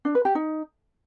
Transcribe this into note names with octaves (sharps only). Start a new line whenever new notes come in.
D4
B4
G4
D#4